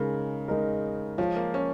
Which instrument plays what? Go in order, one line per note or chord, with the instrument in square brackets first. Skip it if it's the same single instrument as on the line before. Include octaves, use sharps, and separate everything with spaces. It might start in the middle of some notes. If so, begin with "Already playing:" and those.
Already playing: [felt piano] C#3 [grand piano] G#3 D#4 A#4
[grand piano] G#3 D#4 A#4
[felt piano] F3 [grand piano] G#3 F4 C#5 F5
[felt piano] A#3
C#4